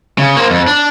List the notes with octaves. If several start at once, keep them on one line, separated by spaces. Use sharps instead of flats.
C#3
A#3 C5
F2
D4